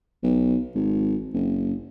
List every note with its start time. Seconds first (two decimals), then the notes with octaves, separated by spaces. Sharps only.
0.23 B1
0.75 G#1
1.34 F#1